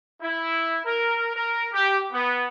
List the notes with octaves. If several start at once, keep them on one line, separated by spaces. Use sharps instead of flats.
E4
A#4
A#4
G4
B3